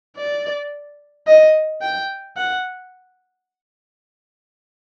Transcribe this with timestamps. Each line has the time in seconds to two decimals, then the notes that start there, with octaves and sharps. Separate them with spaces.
0.17 D5
1.27 D#5
1.81 G5
2.37 F#5